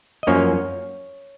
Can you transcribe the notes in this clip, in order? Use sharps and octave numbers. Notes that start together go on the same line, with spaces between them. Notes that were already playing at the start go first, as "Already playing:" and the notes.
D#5
F#2 F3 A#3 C#4 C#5